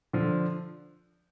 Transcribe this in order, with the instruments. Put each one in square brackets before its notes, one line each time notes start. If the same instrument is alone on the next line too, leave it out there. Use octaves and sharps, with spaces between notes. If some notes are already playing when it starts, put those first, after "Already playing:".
[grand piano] D3 F3